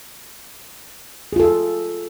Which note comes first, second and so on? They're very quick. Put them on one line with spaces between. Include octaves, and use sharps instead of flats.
G#4 F4 A4